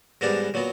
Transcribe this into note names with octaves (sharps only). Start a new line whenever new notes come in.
G#2 E3 G3 B3 D4 A#4
A#2 F#3 B3